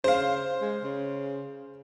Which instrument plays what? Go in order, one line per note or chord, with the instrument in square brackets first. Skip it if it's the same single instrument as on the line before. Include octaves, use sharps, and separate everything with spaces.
[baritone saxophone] C#3 [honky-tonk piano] C5 F5
[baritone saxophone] G#3
C#3